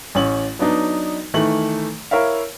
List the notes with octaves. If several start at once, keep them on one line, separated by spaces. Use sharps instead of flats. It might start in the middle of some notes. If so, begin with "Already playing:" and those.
A1 C#4 F#7
F#3 B3 D4 D#4
D#3 E3 A3 F#7
E4 A#4 C#5 E5 F5